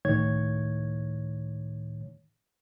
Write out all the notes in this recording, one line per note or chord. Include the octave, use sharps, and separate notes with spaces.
C#2 A2 D#3 C#5 G#6